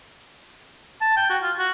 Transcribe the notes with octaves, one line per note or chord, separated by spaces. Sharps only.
A5
G5
F#4
F4
F#4